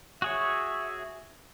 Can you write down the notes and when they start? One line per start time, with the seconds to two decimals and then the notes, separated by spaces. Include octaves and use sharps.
0.22 F#4 G#4 C#5 E5